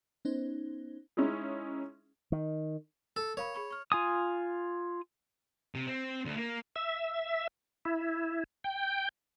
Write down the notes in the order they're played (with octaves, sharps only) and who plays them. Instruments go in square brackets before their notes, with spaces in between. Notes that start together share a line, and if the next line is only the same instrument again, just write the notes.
[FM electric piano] B3 C#4 D#4 C5
[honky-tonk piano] G#3 C#4 D#4 E4 G#4
[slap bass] D#3
[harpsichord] A4
[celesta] A#4 F5 B5 [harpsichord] C#5
[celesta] G#4 B5 C#6
C#6 F6
[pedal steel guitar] F4 G#5 D#6
[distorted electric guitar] C3
C4
D2
A#3
[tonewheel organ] E5
E4
G5